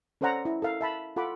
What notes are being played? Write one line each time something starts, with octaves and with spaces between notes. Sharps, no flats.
C#4 A4 C5 D5 F#5 A#5
E4
A4 A#4 F5
E5 A5 B5
F4 A4 F#5 B5 D6